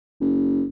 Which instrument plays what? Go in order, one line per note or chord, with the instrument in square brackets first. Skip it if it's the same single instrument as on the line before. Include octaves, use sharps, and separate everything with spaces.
[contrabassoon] F#1